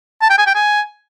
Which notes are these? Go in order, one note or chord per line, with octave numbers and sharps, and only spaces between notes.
A5
G5
G#5
G5
G#5